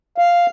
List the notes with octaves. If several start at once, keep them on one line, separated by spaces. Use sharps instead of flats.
F5